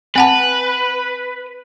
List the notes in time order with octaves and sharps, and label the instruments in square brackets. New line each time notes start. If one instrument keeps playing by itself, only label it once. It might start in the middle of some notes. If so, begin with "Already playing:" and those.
[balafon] C4 F#5 A5 [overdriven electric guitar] B4